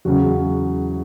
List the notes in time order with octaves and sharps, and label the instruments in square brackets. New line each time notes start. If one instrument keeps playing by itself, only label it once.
[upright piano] E2 C#3 F#3 F#4